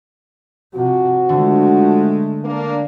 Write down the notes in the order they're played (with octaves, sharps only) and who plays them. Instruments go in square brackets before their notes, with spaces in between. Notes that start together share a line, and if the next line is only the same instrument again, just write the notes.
[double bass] C3 [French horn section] F3 F#4
[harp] D3 [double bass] G#3 A3
[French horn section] A#3 D4